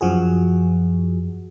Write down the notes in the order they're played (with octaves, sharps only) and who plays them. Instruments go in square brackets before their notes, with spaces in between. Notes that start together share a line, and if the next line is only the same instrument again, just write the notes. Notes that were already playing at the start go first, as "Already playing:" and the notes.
[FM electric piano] F#2 F3 F#4 G#4